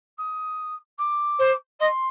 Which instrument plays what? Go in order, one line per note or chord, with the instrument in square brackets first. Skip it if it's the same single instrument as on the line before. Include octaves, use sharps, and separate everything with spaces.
[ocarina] D#6
D6
[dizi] C5
[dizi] D#5 [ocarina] C6